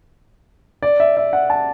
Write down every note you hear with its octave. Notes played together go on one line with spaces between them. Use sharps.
D5
E5
E5
F#5
A5